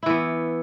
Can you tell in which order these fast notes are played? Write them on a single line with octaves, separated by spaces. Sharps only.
E4 E3 B3